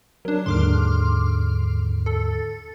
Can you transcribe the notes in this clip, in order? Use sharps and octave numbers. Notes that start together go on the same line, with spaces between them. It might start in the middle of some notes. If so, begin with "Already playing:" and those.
F#3 D4 A#4
D#2 G#2 D3 C6 D6 F6
A4